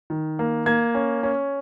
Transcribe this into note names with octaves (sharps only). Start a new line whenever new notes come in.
D#3
A#3
A#3 G#6
C#4
C#4